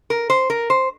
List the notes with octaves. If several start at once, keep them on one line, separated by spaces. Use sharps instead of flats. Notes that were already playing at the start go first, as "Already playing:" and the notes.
A#4
C5
A#4
C5